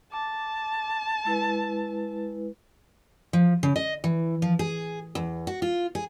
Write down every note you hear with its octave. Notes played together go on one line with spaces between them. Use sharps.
A5 D6
G#3 E4 B4
F3
C#3
D#5
E3
F3
G#4
E2
F#4
F4
G#4